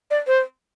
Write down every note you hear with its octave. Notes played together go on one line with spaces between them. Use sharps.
D5
C5